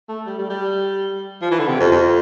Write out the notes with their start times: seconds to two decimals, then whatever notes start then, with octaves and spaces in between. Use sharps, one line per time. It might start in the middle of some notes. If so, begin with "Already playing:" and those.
0.09 A3
0.26 G3
0.38 G3
0.50 G3
1.42 F3
1.51 E3
1.59 D3
1.68 C3
1.80 F2
1.92 F2